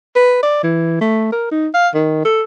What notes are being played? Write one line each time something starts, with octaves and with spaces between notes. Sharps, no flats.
B4
D5
E3
A3
A#4
D#4
F5
D#3
A4